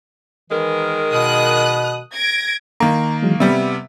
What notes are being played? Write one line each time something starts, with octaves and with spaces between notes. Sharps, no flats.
D#3 E3 G#3 A#4
B2 D#6 F#6
G#6 A#6 D7
D#3 A#3 A#5
E3 F#3 G#3
C3 G3 B3 E5